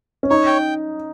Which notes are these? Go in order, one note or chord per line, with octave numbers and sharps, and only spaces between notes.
C#4
D#4 C#5
G5